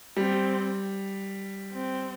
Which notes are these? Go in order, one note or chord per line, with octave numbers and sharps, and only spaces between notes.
G3 C4
C4